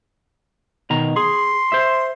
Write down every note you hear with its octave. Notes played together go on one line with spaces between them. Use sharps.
B2 D#3 A#5
G#4 C6
C5 E5